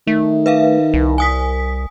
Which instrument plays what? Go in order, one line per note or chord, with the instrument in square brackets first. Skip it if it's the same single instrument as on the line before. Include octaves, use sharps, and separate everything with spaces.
[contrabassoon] D#3 [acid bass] A3
[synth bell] B4 E5 F5
[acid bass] C2
[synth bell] G#5 D#6 B6